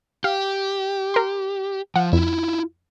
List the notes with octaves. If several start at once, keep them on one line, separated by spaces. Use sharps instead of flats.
G4 F5
A#4 C6
F3 F#5
F2 E4 F4